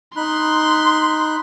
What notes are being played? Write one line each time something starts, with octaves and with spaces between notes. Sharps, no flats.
D#4 B5 C6 F#6